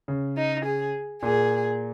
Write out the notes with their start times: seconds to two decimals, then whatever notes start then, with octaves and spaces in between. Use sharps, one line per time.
0.08 C#3
0.37 D#4
0.65 G#4
1.22 A#2 G#4